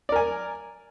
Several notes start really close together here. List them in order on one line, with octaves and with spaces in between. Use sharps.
D5 A#4 G#5